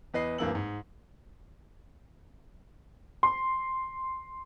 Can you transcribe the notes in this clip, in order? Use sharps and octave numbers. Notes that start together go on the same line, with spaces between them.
E2 B4 D#5 C7
D1 G2 E3 A#3 E6 F#7
G#2
C6